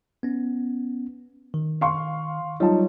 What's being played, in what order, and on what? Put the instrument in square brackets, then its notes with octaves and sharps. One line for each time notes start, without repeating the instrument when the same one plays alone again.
[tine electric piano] B3 C#4
D#3
[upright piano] F5 C6 C#6
[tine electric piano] F#3 G3 C#5 [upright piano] D#4 F4 A5